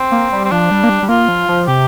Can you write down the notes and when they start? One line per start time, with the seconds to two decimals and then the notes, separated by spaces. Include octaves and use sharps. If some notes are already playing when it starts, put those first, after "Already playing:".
Already playing: C4
0.12 A#3
0.32 G3
0.45 C4
0.51 F3 D4
0.71 G3
0.84 A#3
0.89 G3
1.02 G3
1.09 A#3 F4
1.28 F3
1.49 F3
1.67 C3 G4